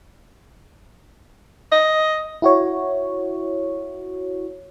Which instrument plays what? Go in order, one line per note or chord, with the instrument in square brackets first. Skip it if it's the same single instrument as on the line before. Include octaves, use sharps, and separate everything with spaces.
[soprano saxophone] D#5
[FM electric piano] E4 F#4 C#5